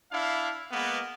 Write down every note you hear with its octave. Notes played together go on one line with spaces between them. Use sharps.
D4 E4 F5
G#3 A#3 B3